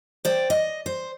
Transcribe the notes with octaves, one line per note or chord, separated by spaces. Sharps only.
C5 D5 G5
D#5
C5